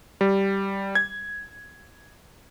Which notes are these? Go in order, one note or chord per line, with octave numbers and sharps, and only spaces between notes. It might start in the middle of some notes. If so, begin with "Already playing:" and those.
G3
G#6